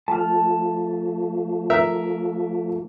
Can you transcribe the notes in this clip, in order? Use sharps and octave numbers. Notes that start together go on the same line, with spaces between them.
F3 A3 A5 F6
A#4 E5